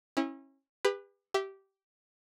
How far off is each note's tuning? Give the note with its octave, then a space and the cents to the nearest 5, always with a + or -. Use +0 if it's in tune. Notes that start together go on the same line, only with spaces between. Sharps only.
C#4 -30 E4 -20
G4 +40 B4 +0
G4 -15 E5 +0